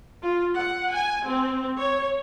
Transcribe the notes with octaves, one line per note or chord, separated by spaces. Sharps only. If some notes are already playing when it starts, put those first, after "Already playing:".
F4
F#5
G#5
C4
C#5